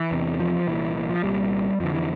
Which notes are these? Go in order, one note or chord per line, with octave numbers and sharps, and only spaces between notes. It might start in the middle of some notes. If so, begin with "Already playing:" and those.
Already playing: E3
E2 C3
F3
C2 A#2 E3
E3
F3
C2 A#2 G3
F2 D3 F3
E3